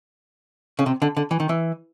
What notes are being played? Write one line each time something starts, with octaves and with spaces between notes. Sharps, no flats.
C#3
C3
D3
D3
E3
D#3
E3